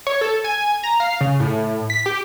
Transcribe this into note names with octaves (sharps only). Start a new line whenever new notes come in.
C#5
A4
G#5
A#5
F5
C#3
A2
B6
G4